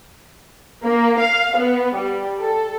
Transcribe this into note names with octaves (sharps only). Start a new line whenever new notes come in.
A#3
F5
B3
G3
A4